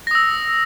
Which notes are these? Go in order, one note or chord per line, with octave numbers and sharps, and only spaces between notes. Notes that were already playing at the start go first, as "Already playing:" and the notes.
D#6 E6 A#6